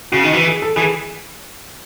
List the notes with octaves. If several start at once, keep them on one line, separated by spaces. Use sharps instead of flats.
C#3 F#4
D#3
E3 F#4
G#4
A4
E3 G#4